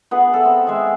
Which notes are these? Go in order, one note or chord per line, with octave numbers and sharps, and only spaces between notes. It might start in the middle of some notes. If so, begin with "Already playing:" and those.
B3 G#4 B4 F#5
A4 E5
C4
G#3 C4 G#4 E5